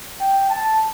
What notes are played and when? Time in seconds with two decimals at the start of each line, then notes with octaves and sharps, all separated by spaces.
0.21 G5
0.50 A5